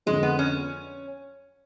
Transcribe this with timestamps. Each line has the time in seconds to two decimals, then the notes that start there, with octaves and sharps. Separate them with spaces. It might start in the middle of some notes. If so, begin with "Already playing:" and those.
0.06 F2 D3 F3 G#3
0.23 B3
0.39 C#4